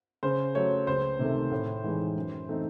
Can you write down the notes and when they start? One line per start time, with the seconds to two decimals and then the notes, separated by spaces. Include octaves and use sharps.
0.23 C#3 C5
0.55 F#3 A3 C#5
0.87 C#2 C5
1.19 C3 D#3 A3
1.51 A2
1.84 E3 G#3 D#4
2.16 F#2
2.49 E3 A3 C4 D#4